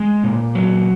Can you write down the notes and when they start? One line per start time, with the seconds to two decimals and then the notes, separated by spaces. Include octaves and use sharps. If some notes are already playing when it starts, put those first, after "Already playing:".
Already playing: G#3
0.24 A#2
0.55 F#3